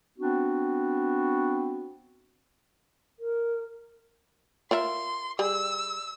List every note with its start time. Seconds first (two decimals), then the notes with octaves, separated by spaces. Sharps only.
0.19 B3 C4 D4 F#4
3.19 A#4
4.71 F4 A#4 E5 C6
5.39 G3 G#4 E6